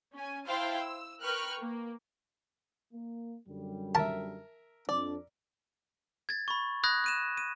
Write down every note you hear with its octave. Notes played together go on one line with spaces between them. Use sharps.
C#4 G#5
E4 C5 F5 G5 A5
E6
A#4 B4 G5 C#6 F6 F#6
A#3
A#3
F#2 D3 G3
A#4 E5 A5
F2 D4 D5
G#6 A6
B5 C#6
B5 D#6 F#6 G#6 A#6
F#6 D#7 E7
D#7